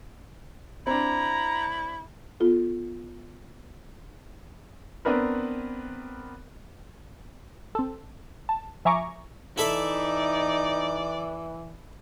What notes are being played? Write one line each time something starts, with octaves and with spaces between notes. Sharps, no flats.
C4 D4 E4 A#5
B3 F4 A4
B3 C4 D4 A#4 B4
C4 A4
A5
F3 E5 G#5 A#5 C#6 D6
E3 D#4 E4 A4 D5 E5